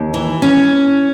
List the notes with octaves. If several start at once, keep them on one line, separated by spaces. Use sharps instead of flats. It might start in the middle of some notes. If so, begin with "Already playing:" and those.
Already playing: D#2
E3
C#4